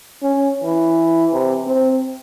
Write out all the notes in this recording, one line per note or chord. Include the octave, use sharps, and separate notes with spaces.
C#4
E3
C3
C4